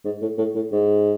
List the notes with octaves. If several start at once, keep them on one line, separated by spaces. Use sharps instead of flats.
G#2
A2
A2
A2
G#2